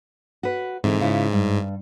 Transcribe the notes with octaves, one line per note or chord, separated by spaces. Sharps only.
F#4 B4
G#2 D3 E3 C4
C#3 E4 F4
G2